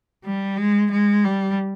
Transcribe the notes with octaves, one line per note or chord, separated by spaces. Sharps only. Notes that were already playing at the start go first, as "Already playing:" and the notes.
G3
G#3
G#3
G3